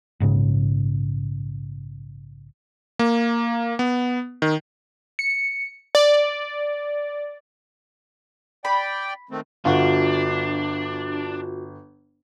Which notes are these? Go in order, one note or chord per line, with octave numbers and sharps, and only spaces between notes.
A#1 G#2 C#3
A#3
B3
D#3
C#7
D5
D5 G5 B5
D#3 A3 C4
G1 D4 F4 F#4